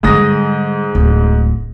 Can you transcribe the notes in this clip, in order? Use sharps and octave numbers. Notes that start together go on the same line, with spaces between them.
G#2 D3 G3 D#6 A#6
D1